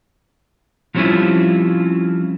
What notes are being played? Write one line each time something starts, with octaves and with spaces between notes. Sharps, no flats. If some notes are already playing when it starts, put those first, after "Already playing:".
F3 G3 C4 C#4 E4 F4